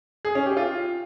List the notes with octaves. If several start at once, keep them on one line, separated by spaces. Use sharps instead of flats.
G#4
C#4
G4
F4